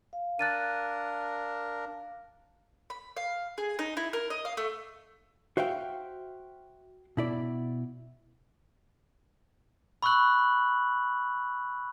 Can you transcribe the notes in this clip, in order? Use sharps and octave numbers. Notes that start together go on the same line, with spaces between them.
F5
D4 A#4 F#6 A6 D#7
B5
F5
G#4
D#4
E4
A#4
D#5
F5
A3
F#4 C5 E5 F5 G5
B2 E4 D5
B5 C#6 E6 F#6 F#7